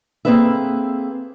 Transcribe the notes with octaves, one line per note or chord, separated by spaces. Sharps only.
A#3 C4 G#4 A4 B4 E5